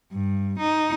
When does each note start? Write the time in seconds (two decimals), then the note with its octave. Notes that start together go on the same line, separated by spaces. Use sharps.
0.12 G2
0.59 D#4